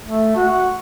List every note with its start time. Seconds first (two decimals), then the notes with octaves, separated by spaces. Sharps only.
0.04 A3
0.36 F#4